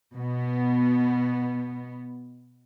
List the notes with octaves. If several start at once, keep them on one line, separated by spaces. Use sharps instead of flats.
B2 B3